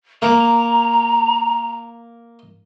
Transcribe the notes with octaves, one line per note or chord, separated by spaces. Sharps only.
A#3 A#5